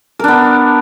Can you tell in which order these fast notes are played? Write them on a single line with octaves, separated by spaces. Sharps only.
A#4 D4 B3